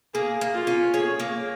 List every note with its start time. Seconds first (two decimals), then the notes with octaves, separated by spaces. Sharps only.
0.14 A#3 G#4
0.41 A#3
0.55 F4
0.67 C#4
0.94 G#4 C#5
1.20 A#3